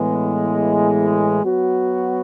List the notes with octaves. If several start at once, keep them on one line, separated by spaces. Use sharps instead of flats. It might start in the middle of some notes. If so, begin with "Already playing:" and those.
Already playing: A2 E3 G#3 B3
F#3 B3 F#4